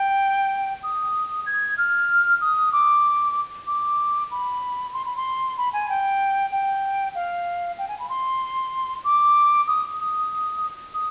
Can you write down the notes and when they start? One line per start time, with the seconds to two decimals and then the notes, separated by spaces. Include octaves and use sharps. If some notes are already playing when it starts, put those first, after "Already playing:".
Already playing: G5
0.83 D#6
1.46 G#6
1.78 F6
2.41 D#6
2.73 D6
3.67 D6
4.31 B5
4.94 C6
5.06 B5
5.16 C6
5.57 B5
5.73 G#5
5.89 G5
6.52 G5
7.15 F5
7.78 G5
7.88 G#5
8.00 B5
8.09 C6
9.04 D6
9.67 D#6
10.00 D#6
10.94 D#6